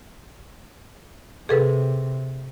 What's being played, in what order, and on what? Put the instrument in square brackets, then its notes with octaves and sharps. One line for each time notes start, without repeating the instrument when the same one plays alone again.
[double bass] C3 [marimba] G#4 A4 B4